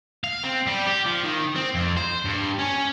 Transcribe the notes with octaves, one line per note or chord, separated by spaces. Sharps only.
F5
C4
G3
G4
F3
D#3
C4
F2
C5
G2
C#4